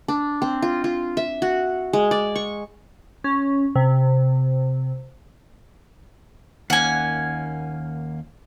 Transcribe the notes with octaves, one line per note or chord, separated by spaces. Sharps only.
D4
C4
F4
F4
E5
F#4
G#3
D5
C#6
C#4
C3
D#2 A#3 C#4 F#5 G#5